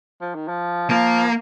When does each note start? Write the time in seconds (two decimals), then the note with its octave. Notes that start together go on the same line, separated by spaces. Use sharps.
0.21 F3
0.35 D#3
0.48 F3
0.90 F3 A#3